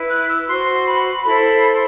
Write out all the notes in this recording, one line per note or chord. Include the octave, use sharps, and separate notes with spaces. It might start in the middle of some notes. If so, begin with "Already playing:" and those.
Already playing: E4 B4
F#6
E6
F#4 C5 C6
B5
E4 A4 C5 B5